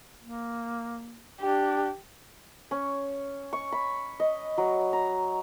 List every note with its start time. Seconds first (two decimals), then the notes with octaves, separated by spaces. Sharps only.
0.22 A#3
1.41 D4 G4
2.71 C#4
3.53 C#6
3.72 B5
4.20 D#5
4.58 F#3
4.93 A#5